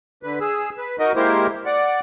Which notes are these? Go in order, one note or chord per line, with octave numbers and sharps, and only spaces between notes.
D3 B4
G#4 E6
B4
D#4 F#4 A#4 D#5
G#3 A#3 E4 G4 A#4 C5
D5 F#5